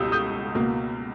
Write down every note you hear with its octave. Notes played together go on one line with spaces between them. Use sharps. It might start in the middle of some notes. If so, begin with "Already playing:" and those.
Already playing: C#2 B2 G3 D#6 E6 G6
D#6 G6
C#2 B2 A#3